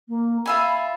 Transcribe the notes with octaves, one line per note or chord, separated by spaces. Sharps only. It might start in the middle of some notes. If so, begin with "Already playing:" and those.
A#3
F4 E5 G#5 B5